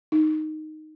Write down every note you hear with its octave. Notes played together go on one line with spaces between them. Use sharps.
D#4